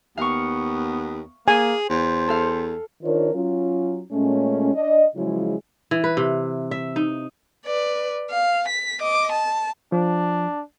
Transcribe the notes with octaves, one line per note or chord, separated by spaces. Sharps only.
D#2 B3 F5 C#6
A#3 G#4 G#5
E2 C5
A4 F5
D#3 D4 F4 A#4 C5 C#5
F#3 C#4 F4
A#2 G#3 A3 C#4
D4 D#5
C#3 F3 F#3 G#3 E4 G#4
E3
B4
C3
E5
D#4
B4 D5
F5
B6
D#5 D6
A5
F3 D4